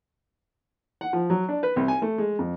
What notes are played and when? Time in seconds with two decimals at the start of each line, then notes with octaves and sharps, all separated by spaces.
1.01 F#5
1.13 F3
1.30 F#3
1.49 D4
1.63 B4
1.76 C2
1.88 G#5
2.02 A3
2.18 G#3
2.39 F2